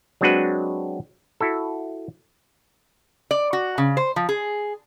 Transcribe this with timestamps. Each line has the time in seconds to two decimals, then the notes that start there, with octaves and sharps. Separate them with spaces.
0.21 F#3 G#3 C4 D4 F#4 B4
1.40 E4 F#4 A4
3.31 D5
3.53 F#4
3.78 C#3
3.97 C5
4.16 F3
4.29 G#4